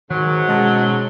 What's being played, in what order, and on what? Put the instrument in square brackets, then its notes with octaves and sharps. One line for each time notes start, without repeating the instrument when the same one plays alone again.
[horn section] G#2 F#3 [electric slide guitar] D#3 A#4
[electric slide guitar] B2 C#4 A5 [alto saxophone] G#3